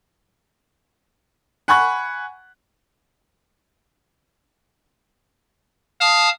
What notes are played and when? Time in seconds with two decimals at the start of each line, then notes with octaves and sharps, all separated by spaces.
1.68 F#5 G#5 B5 C#6 F#6
6.00 F5 A5 D#6